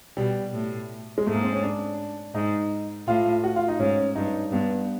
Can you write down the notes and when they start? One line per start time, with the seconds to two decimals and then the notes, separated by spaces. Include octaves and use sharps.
0.17 B2 G3
0.53 A2
1.18 G#3
1.26 G#2 A3
1.35 A#3
1.44 C4
1.53 C#4
1.63 D4
2.34 G#2 D#4
3.07 A2 F4
3.44 F#4
3.56 F4
3.68 D#4
3.80 G#2 C#4
4.15 G2 D#4
4.52 G2 B3